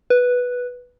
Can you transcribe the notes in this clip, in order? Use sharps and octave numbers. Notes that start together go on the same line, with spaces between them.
B4